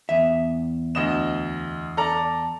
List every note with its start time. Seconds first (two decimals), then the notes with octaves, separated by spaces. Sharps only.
0.09 E2 E5
0.95 D2 D#5 E7
1.97 A4 D5 A#5